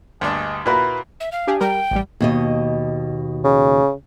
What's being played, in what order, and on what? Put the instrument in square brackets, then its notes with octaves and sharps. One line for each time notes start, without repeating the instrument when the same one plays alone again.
[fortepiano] D2 G2 D4 [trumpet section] G#4 D#5
[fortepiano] A#2 F#4 A#4 [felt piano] E4 B4 [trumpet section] B5
[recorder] E5
F5
[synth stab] D4 G4 G#4
[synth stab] G3 A#4 [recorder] G5
[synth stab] A1 G3
[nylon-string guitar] D#2 B2 D#5
[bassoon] C#3